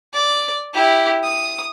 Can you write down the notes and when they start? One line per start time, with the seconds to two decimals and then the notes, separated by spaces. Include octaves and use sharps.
0.13 D5
0.74 E4 G4
1.23 D#6